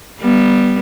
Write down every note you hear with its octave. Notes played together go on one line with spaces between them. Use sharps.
G3 B3